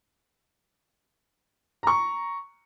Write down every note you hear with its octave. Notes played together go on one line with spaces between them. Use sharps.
A#5 C#6